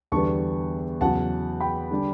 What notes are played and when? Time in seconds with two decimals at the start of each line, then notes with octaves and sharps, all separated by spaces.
0.12 E2 D3 G3 B3 A5 C#6
1.01 E2 C#3 F#3 F#5 A5
1.61 G5 B5
1.91 D3 G3 D4